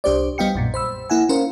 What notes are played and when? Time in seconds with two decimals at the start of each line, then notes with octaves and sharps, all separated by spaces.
0.04 C2 D4 G4 C5 D5
0.38 G3 B3 D#5 F5 G5 C#7
0.55 B1 F#2 A#2
0.74 C5 B5 E6
1.10 A#3 E4 F#5 G#5
1.29 C#4 A#4 C5 F5